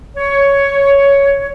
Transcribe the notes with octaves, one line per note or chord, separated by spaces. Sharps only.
C#5